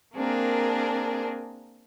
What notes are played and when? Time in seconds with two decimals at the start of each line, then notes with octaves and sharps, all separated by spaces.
0.15 A#3 C4 D4 G#4 A#4